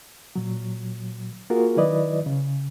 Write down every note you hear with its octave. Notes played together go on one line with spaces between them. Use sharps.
A#2 F#3
A#3 F4 F#4 G#4 A#4
D#3 F#3 E4 B4 D5 D#5
C#3